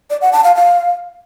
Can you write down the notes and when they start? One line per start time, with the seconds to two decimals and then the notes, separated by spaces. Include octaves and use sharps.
0.10 D5
0.21 F#5
0.33 A5
0.44 F5
0.55 F5